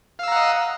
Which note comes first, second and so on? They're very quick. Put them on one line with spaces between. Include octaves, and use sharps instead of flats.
F5 E6 A#5 F#5 D#5